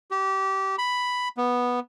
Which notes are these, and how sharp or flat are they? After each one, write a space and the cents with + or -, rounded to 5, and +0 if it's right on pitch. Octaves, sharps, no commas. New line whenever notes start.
G4 -25
B5 +5
B3 -10